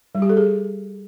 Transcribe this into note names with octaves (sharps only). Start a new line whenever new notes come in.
G3
G4
A4
G#4